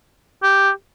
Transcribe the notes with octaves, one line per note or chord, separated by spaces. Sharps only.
G4